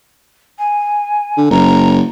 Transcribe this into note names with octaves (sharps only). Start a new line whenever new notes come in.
G#5
D3
F#1 A#5